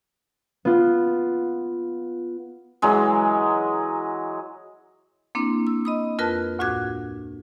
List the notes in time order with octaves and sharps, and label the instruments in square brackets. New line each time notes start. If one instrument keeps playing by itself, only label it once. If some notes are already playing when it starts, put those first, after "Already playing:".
[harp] B3 F4
[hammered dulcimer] E3 F#3 G#3
[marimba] A#3 C4 D4 E4
E6
D#5 B5 D#6
F2 F4 A#4 B4 A5 F#6
D2 A2 F#4 D6 F#6 G#6